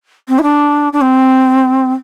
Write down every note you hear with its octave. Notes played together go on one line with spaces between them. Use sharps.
C4
E4
D4
D4
C4